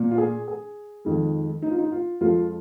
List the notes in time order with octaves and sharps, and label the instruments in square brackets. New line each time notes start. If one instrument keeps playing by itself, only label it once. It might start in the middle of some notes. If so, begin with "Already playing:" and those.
Already playing: [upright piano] A#2 A#3
F4
G#4
G#4
F2 D#3 G#3
D#4
F4
D#4
F4
F2 F3 G#3 F4